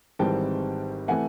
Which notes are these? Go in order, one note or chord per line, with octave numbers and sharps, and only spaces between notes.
G#1 G#2 E3 G3 C4 G5 A5
C3 E3 A3 F#5 G#5